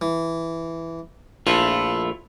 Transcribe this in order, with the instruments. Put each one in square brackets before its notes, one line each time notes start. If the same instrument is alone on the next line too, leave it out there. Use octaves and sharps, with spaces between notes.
[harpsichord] E3
[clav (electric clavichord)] A#1 [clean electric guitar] A3 E4 F4 [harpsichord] A4